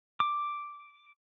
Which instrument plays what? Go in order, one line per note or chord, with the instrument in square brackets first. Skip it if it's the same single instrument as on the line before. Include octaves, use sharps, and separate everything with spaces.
[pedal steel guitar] D6